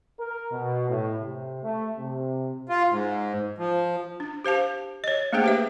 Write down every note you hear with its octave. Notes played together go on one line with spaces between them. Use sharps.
A#4
B2
A2
C3
A3
C3
F4
G#2
F3
D4
G4 C5 F5 A5
C#5 D#5
A3 A#3 D4 G#4 C5 G5
G4 B4 E5